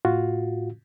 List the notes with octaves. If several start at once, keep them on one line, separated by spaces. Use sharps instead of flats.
A2 F4 F#4